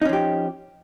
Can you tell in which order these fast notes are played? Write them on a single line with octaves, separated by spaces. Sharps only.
D#4 C#4 F3 G4